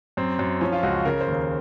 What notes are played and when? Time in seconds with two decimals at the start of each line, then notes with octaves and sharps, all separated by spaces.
0.17 F#2 C4
0.39 F#2
0.61 F3 C#4
0.72 F4
0.83 C#2 F#4
1.05 C#3 A#4
1.21 C5
1.28 D#2
1.35 A#4